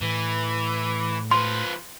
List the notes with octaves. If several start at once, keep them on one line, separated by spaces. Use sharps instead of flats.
A2 E3
F3 B4 C6